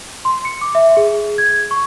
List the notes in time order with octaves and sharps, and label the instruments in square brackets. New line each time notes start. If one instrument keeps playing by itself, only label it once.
[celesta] C6
C#7
D6
E5
G#4
G#6
C#6